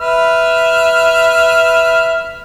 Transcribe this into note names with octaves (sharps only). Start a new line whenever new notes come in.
B4 E5 F6